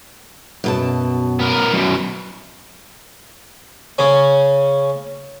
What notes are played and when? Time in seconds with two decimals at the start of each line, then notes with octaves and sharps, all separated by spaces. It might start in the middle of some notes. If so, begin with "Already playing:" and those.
0.64 F#2 B2 A5
1.39 B3 A#4
1.73 F#2 B2
3.98 C#3 C#4